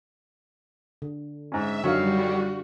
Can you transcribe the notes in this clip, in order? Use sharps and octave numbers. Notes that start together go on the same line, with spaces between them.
D3
G#2 C#4 E5
F#2 D3 D#3 G3 F#4 F5